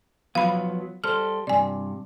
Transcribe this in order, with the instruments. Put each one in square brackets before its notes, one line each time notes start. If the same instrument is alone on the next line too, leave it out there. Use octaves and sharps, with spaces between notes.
[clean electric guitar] F3 F#3 B3 [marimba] F5 B5
[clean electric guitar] G3 A4 C5 [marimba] F6
[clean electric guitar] G2 C3 [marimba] D5 G#5